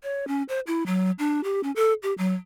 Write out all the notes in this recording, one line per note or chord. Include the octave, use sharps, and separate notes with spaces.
C#5
C#4
C5
E4
F#3
D4
G4
C#4
A4
G4
F#3